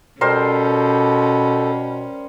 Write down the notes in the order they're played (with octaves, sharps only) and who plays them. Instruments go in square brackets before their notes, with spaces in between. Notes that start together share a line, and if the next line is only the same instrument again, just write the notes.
[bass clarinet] B2 [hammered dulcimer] G3 A#4 C5 [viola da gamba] C#4 [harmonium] A4